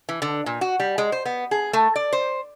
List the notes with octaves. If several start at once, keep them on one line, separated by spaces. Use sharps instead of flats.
E3
D3
A#2
F#4
G3
G#3
C5
B3
G#4
A3
D5
C5